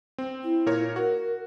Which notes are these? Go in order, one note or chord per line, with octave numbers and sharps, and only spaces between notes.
C4
E4
A#2 A#4 C#5
F#4 A#4